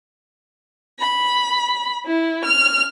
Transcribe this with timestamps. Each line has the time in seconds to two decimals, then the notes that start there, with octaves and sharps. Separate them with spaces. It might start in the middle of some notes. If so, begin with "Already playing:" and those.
1.00 B5
2.06 E4
2.45 F6